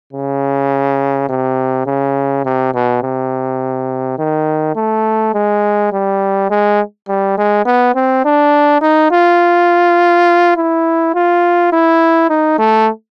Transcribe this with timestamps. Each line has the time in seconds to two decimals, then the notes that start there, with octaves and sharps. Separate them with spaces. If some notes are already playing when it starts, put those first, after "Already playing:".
0.13 C#3
1.29 C3
1.86 C#3
2.45 C3
2.74 B2
3.03 C3
4.19 D#3
4.76 A3
5.34 G#3
5.92 G3
6.50 G#3
7.08 G3
7.38 G#3
7.66 B3
7.95 C4
8.25 D4
8.82 D#4
9.12 F4
10.56 E4
11.15 F4
11.72 E4
12.30 D#4
12.58 A3